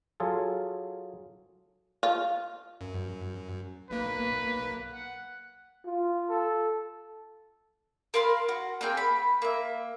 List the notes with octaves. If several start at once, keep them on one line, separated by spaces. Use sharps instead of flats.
F#3 F4 G#4 A4
F4
F#2
B1 A#3 B4
F#5
F4
A4
A#4 F5 B5 C6
F#4
A#3 C4 G#4 G5
B5
A#3 E5